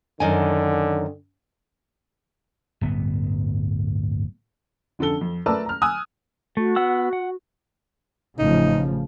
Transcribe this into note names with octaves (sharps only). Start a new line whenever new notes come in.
F#2 D3 D#3 G#5
D1 G1 B3
F1 D3 C#4 A4 G7
F2
A3 A#4 B4 D5 A5 E6
A#5 F6
G#5 D#6 E6 F#6
A3 F#4
B3 F#5 E6
F#5
A1 C#3 F3 D#4